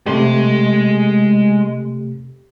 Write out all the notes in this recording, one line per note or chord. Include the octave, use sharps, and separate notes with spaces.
C3 G#3 A3 G4 C6